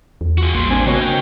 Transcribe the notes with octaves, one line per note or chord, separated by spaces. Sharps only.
E2
F4 F#4 G#4
A1 G3 A#3 C6
C4 D4 C5 G#5
C#3 A#3 B3 F#4 C#5 D#5
A#4 G5